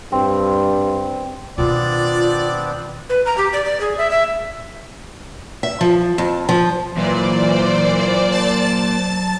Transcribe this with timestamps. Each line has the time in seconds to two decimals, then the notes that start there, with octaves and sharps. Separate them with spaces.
0.12 G2 C4
1.58 B2 D#3 B3 C4 D4 F4 D5
3.09 B4
3.26 A#5
3.38 G4
3.53 D5
3.65 D5
3.81 G#4
3.98 E5
4.11 E5
5.63 E5
5.81 F3
6.18 F2
6.49 F3
6.98 A#2 E3 F#3 C5 D5
8.32 A5 A6